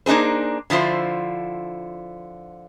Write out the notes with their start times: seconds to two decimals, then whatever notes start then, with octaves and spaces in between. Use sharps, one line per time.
0.06 A#3 D4 D#4 G#4 C5
0.70 D3 F3 E4 F4 C5